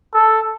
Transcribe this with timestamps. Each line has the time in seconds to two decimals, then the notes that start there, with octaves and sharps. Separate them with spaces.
0.14 A4